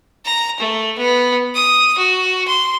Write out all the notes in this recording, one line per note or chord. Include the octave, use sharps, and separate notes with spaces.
A#5
A3
B3
D#6
F#4
C6